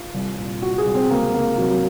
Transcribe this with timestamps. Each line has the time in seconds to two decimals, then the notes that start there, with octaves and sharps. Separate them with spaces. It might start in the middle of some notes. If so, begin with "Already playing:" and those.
Already playing: F4
0.14 C2
0.37 A#2
0.62 A#2 F#4
0.78 G#4
0.85 C2
0.94 C4
1.10 C#2 A#3
1.34 C#2 A#3
1.58 C3 F#3
1.70 F#3